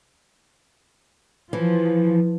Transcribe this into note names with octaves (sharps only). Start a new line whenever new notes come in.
E3 F3